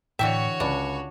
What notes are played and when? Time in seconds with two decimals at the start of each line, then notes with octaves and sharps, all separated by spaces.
0.19 A2 D3 E3 F#4 C#5 E5 G5
0.60 C#2 D4 B5